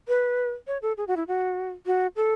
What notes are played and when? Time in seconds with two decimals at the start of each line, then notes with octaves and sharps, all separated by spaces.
0.08 B4
0.67 C#5
0.82 A4
0.97 G#4
1.07 F#4
1.16 E4
1.28 F#4
1.86 F#4
2.16 A4